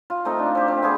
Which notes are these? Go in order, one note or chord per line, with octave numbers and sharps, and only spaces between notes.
F4
A3 C4 D#4
D4
C4 G4
C4
B3 F4 G#4